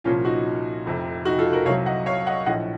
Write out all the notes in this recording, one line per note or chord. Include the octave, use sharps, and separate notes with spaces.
C2 A#2 F3 C#4 F4
D#4 F#4
F1 F2 C3
D#4 F#4
F4 A4
F#4 A#4
C2 C3 F#3 C#5 F5
D#5 F#5
C#5 F5
D#5 F#5
A#1 A2 F3 D#5 F#5